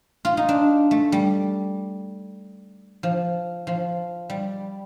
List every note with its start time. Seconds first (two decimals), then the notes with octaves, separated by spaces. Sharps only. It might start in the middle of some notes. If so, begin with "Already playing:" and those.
0.25 F4
0.37 D#4
0.49 D4
0.91 A3
1.12 G3
3.03 F3
3.67 F3
4.30 G3